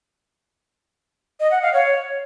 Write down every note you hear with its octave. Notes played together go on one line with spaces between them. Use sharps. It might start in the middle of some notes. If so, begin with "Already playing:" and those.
D#5
F#5
F5
C#5